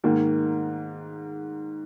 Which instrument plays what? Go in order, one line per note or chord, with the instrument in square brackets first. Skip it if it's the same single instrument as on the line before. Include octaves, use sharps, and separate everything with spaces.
[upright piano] G#2 D#3 A#3